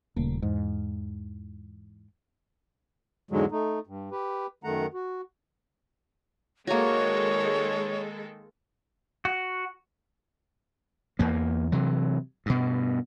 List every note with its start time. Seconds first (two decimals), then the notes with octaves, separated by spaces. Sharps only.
0.16 D#1 C#3 A3 A#3
0.42 E2 G#2
3.31 E2 G#2 D3 F#3 G#3
3.51 A3 D#4
3.87 G2
4.11 G4 B4
4.64 F#2 D#3 A3 F#5 A#5
4.94 F#4
6.67 D#3 G#3 A#3 F#4 A4 C#5
9.25 F#4
11.19 E2 A#3
11.72 C3 E3 F#3
12.46 G2 B2